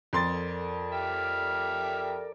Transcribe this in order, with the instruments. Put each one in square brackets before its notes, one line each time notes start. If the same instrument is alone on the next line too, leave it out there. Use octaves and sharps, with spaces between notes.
[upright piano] F2 C6 A6 [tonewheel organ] A4 A#4 D5
[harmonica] G4 E5 F6